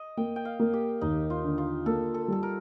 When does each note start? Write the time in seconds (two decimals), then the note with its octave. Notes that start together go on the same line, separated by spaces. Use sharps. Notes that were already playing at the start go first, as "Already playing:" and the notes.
Already playing: D#5
0.17 A#3 G5
0.36 G5
0.45 F5
0.59 A#3
0.73 G4
1.01 D#2 D#4
1.30 F4
1.44 D3
1.58 F4
1.86 A#3 A4
2.14 A4
2.28 G3 A4
2.43 A#4